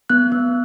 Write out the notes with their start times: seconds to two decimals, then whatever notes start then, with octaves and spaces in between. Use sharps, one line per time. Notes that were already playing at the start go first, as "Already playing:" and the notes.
0.10 B3 F#6
0.32 B3